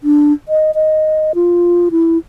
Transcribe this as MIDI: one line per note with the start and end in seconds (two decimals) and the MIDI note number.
0.03 0.33 62
0.48 0.71 75
0.75 1.32 75
1.35 1.89 65
1.91 2.18 64